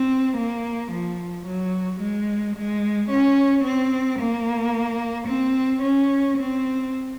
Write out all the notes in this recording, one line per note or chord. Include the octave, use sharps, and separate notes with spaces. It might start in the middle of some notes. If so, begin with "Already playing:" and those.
Already playing: C4
A#3
F3
F#3
G#3
G#3
C#4
C4
A#3
C4
C#4
C4